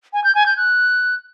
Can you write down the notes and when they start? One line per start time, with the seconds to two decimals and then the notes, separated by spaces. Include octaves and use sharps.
0.13 G#5
0.24 G6
0.35 G#5
0.46 G6
0.57 F#6